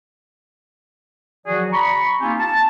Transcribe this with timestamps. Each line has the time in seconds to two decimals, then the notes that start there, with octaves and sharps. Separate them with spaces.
1.47 D#3 F3 F#3 F#4 G#4 D5
1.72 A#5 B5 C#6
2.22 A#3 C4 D#4 F4 G4 G#5
2.40 A5